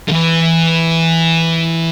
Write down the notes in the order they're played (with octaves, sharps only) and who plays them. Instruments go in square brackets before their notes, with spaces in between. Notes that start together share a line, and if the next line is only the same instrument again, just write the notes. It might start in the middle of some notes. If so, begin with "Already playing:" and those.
[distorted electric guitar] D3
E3